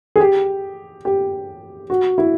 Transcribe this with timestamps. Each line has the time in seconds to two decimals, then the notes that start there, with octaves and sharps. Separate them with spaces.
0.16 G#4
0.20 G4
1.05 G4
1.90 F#4
2.18 E4